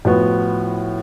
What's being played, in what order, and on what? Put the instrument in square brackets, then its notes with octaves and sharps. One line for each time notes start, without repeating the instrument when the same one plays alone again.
[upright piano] A2 F3 B3 F#4